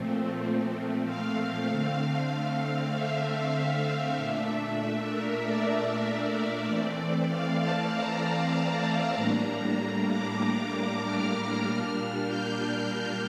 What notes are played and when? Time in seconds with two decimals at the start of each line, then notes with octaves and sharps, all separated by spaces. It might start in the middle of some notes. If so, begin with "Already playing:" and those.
Already playing: A#2 F3 A3 C4
1.05 F5
1.68 D3 A3 C4
2.92 E5
4.17 A#2 A3 D4
5.10 A#4
5.42 D5
6.66 E3 A3 C4
7.28 F5
7.59 A5
7.90 A#5
8.21 A5
8.53 A#5
9.15 A2 G3 A#3 D4
10.08 D6
11.02 F6
11.64 A#2 G3 A#3 D4
12.26 G6